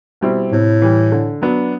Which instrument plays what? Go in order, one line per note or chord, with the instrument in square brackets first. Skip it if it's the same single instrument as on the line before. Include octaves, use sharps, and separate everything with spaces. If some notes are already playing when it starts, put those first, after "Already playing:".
[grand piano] B2 G3 C4 E4
[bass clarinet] A2 [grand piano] C3
[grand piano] E3 G3
D3
F#3 B3 D4